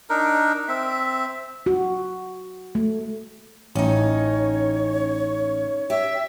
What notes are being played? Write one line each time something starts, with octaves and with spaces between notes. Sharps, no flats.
D4 D#4 A#4
C4 E5
F#4
A3
A1 C#4 D#4 C#5
G4 E5